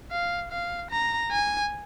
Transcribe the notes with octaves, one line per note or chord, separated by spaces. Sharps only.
F5
F5
A#5
G#5